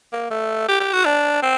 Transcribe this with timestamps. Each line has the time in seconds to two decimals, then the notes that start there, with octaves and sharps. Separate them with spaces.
0.13 A#3
0.31 A3
0.68 G4
0.80 G4
0.93 F#4
1.05 D4
1.42 C4